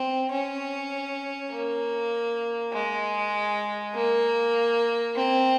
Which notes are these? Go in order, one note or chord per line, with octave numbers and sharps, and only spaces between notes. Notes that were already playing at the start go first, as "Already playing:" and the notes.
Already playing: C4
C#4
A#3
G#3
A#3
C4